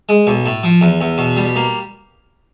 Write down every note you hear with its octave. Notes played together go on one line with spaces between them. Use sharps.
G#3
B1
A2
F3
E2
E2
B2
G3
A#3